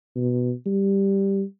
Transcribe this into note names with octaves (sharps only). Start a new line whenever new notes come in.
B2
G3